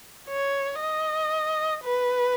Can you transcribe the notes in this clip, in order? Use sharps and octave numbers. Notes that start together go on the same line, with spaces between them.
C#5
D#5
B4